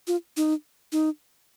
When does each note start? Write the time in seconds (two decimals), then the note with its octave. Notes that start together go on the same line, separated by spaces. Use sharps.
0.08 F4
0.37 D#4
0.92 D#4